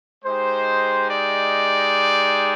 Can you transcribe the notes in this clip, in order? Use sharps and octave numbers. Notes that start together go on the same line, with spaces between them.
G#3 D#4 G4 C5
D5